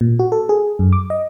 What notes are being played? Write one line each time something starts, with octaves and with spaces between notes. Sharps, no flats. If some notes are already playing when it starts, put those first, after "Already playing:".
A#2
F#4
A4
G#4
F#2
D6
D#5